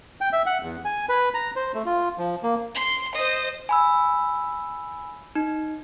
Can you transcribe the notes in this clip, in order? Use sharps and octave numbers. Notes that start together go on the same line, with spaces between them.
G5
E5
F#5
E2
G#5
B4
A#5
C5
A3
F4
F3
A#3
C6
C5 D#5
G#5 B5 E6
D#4